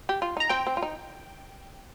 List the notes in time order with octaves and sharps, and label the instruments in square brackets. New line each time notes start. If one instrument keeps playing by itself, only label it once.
[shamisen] G4
F4
[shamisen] D#4 [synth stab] A#5
[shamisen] C4 [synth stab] G5
[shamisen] C4
F4
D#4